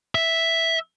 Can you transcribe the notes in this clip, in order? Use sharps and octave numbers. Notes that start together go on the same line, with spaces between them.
E5